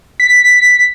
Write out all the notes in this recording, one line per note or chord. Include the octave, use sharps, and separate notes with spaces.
B6